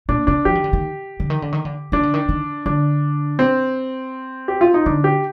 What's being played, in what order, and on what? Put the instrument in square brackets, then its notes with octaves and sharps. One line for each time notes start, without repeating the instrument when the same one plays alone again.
[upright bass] A#2 [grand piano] D4
[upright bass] C3 [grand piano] D4
[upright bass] F3 [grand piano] G4
[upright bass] D#3
D3
D#3
D3
D#3
D3
D#3
D3
[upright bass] D#3 [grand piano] D4
[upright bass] D3
D#3
D#3
[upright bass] D3 [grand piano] D4
[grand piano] C4
G4
F4
D#4
[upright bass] D3 [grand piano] D4
[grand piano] G4